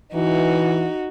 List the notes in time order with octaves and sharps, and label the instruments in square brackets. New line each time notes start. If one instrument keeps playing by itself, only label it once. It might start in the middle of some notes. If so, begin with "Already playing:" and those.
[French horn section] E3 [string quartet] D#4 F#4